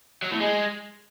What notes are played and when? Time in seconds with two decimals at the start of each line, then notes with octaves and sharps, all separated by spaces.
0.23 F#3
0.32 A2
0.41 G#3